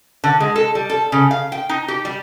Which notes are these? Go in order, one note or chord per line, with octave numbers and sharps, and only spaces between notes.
D3
G#3
A4
G3
A4
C#3
F5
G5
D#4
G4
G3